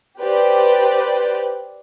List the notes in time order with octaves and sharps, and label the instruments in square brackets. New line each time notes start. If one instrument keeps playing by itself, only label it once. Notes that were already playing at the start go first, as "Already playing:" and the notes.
[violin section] G4 B4 C5 D5